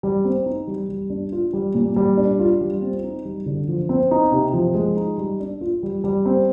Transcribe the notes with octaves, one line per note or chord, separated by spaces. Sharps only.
G3
C4
D#4
G3
G3
D4
F4
G3
A#2
G3
D4
F4
G3
C4
D#4
G3
D3
F3
C4
D#4
C3
F3
G#3
D#4
G3
D4
F4
G3
G3
C4